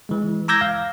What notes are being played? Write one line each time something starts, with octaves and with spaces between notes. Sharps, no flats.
E3 G#3
A#5 D6 E6 G6 G#6 A#6
F5